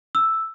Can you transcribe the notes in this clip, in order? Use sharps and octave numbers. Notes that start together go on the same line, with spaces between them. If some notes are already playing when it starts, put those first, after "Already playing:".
E6